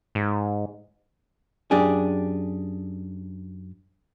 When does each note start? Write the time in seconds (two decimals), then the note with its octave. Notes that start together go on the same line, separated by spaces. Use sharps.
0.15 G#2
1.71 F#2 D4 G4 G#4